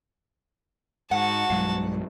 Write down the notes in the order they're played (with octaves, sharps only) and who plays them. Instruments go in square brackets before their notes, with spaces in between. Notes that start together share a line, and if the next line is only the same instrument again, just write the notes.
[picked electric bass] G#2 [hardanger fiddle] F#4 A5 [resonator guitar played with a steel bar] F#5
[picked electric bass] B1 G2 G#3 [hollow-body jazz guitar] F#3 F5